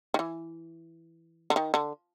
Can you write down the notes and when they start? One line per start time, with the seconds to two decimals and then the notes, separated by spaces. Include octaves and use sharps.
0.14 D#3
0.19 E3
1.50 D3
1.56 D#3
1.74 D3